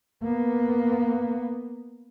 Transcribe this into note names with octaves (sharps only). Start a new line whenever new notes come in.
A#3 B3